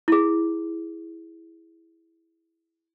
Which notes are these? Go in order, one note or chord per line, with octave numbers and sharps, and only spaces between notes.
E4 G#4